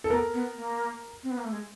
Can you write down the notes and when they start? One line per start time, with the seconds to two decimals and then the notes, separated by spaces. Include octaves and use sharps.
0.04 A4
0.10 B3 A#4
0.34 B3
0.57 A#3
1.23 C4
1.31 B3
1.38 A#3
1.45 A3
1.52 G#3